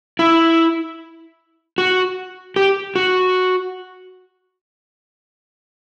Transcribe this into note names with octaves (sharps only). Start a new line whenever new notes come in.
E4
F#4
G4
F#4